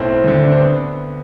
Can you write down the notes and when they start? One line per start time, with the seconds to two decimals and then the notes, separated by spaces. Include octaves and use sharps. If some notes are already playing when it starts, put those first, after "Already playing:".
Already playing: B1 A2 C4
0.24 D2 D3
0.44 D4
0.52 C4
0.60 B3